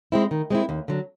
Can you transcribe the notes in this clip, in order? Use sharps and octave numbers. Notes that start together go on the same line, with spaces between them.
G#3 C4 E4
D#3
G#3 C4 E4
D#2
D3 F#3